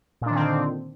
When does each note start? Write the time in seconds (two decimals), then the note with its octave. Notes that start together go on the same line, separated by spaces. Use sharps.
0.22 A#2
0.26 D4
0.31 D#3
0.35 C4
0.40 D3